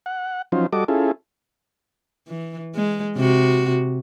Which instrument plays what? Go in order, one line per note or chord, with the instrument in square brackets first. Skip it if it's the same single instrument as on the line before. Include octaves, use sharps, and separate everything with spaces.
[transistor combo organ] F#5
F3 F#3 C#4 D#4 F4 C5
G3 F#4 A4 D#5 D6
C#4 E4 F4 G#4 A4
[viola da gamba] E3
G#3
C3 F#4